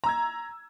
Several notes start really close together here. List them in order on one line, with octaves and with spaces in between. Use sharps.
A#5 E6 G#6